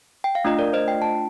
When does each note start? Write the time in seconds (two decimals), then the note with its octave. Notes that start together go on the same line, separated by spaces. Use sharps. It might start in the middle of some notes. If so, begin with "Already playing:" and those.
0.24 G5
0.35 F5
0.44 A3 D4 F4 D#5
0.59 A#4 D5
0.73 C5 D#5
0.88 G5
1.02 A5